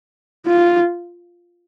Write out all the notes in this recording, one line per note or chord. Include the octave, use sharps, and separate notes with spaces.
F4